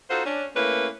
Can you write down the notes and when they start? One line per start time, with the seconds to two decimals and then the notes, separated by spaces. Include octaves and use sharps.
0.10 D#4 F4 F#4 A4 C5
0.26 C#4 D4
0.56 A3 A#3 C#4 E4 B4